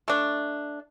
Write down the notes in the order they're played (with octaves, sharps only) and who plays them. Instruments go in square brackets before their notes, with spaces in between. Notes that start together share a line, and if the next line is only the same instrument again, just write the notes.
[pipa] A3 D4